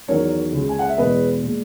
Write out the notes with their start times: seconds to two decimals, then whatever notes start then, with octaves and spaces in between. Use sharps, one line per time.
0.08 E2 D#3 F#3 A#4 C#5
0.52 C#2 C#3 G#3
0.69 G#5
0.79 F#5
0.89 E5
0.97 E2 B2 G#3 B4 D#5
1.43 A#2 G#3